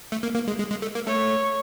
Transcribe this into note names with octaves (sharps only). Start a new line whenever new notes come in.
A3
A#3
A#3
G#3
G#3
G#3
A3
A#3
A3 C#5